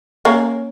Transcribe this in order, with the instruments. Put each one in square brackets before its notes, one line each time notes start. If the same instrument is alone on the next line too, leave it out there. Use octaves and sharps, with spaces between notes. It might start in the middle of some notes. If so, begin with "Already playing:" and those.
[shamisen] A#3 C#4